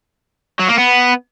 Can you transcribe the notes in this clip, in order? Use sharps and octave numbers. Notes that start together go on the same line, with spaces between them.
F#3
A#3
B3